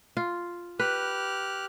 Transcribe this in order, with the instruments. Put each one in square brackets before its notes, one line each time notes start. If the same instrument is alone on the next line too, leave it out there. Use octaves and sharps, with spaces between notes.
[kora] F4
[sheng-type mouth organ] G4 F6 F#6 [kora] B4